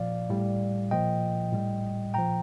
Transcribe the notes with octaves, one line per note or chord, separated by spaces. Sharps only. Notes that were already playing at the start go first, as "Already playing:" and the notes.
Already playing: A#2 F3 D5 F5
A2 G3
A#2 F3 D#5 G5
A2 G3
A#2 F3 G5 A#5